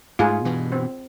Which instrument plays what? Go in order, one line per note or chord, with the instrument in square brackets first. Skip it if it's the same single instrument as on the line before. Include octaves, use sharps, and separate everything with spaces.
[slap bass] G#2 A3 [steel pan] F4 G#4
[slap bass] G2 B2 E3
[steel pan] C4